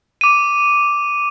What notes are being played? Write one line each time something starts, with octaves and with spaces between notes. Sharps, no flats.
D6 D#7